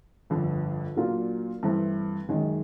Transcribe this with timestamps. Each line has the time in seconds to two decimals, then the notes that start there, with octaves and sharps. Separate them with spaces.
0.30 G1 F2 D3
0.97 A#2 F#3 A#3 D4 F4
1.63 G2 E3 A3 C4
2.29 F#2 D#3 G#3